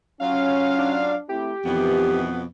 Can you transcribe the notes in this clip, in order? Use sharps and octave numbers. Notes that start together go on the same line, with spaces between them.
F#3 C#4 F4 F5
D4
A3 C4 E4 G4
F2 B2 D#3 E3 B3